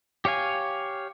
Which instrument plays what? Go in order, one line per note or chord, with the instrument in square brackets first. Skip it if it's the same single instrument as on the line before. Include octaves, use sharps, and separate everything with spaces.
[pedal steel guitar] G4 C#5 F5 G#5